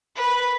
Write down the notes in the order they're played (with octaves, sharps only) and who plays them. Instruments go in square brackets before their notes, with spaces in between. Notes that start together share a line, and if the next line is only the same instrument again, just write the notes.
[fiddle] B4